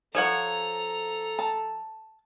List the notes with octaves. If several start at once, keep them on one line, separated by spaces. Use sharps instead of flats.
F3 A4 C#5 F#5 A#5
A5